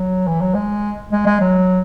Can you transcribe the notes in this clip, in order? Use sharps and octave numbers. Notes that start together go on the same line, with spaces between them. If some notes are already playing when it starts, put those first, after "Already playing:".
Already playing: F#3
E3
F#3
G#3
G#3
G#3
F#3